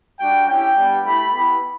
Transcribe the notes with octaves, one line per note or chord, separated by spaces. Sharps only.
G3 D4 F#4 G5
C#4 E4 G4 G5
G3 B3 D4 G4
A3 E4 G4 B5
B3 E4 G4 B5